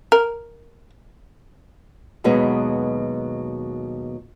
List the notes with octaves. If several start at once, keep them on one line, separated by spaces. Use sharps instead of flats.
A#4
D#2 B2 F#3 G#3 B3 D#4